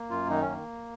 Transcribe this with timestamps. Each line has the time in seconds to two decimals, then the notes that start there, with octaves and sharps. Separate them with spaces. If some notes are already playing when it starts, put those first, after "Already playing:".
Already playing: A#3
0.10 F#2 F4
0.29 D#3 D#4
0.42 C#4
0.49 A#3